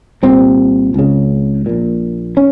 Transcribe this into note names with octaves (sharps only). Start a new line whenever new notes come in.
C2 A#2 C4
C#2 C#3
A#1 A#2
C#4